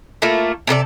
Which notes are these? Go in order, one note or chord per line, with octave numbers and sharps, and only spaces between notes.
A3 A#3 E4 F4
C3 A4 A#4 D5